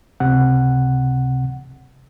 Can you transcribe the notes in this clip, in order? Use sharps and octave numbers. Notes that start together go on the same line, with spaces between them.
C#2 C3 F#5